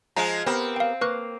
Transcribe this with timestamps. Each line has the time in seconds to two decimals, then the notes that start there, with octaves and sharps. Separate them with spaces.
0.16 F3 G#3 F4 A#5
0.46 B3 C4 G4 A#4
0.76 F5 G5
1.01 A#3 B4 C#6 F#6